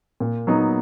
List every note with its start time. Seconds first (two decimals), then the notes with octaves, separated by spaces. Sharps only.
0.20 A#2
0.47 F#3 B3 D#4